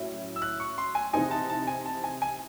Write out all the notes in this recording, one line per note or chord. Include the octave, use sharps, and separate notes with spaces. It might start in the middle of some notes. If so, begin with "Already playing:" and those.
Already playing: A2 F#3 C#4 E4
E6
F#6
C#6
C6
G#5
C3 E3 C4 D#4 G#5
A5
A5
G#5
A5
G#5
G#5